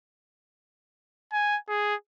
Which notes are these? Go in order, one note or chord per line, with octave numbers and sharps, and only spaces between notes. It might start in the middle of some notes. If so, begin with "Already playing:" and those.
G#5
G#4